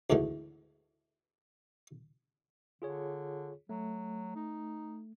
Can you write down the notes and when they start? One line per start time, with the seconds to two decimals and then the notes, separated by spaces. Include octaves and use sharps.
0.10 D2 G#2 D3 E3
2.82 D3 F4 G#4 C#5
3.69 F#3 A3
4.36 D#4